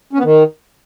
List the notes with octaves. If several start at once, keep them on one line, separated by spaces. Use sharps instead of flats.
C#4
B3
D#3